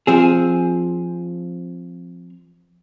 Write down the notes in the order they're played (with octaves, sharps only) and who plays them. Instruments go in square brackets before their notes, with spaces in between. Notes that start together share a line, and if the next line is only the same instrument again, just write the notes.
[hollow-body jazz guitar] F3 C4 G#4